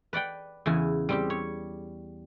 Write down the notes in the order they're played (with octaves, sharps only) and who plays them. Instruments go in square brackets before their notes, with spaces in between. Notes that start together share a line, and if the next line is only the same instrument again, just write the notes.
[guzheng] B4 D5 F#5 G5
E2 C#3 E4 G#5
G3 C4 G4
C#5